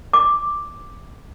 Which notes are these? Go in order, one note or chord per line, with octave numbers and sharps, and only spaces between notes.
D6